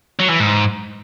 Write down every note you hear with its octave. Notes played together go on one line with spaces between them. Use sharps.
F#3
E3
G#2